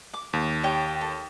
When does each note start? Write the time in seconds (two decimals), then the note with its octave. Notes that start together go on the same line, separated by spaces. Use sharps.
0.14 D6
0.33 D#2
0.63 G4 C#5 G5
1.01 A4